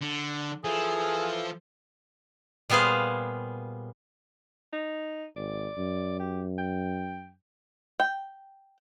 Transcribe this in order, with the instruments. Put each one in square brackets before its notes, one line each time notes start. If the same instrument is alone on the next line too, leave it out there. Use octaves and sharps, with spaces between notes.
[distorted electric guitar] D3
[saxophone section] E3 A4 [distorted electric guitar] F3 [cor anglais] G#4
[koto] A#2 G3 B3 G#4 C5 F5
[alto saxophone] D#4
[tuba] G#1 [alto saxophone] D5
[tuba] F#2
[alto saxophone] G4
G5
[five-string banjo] G5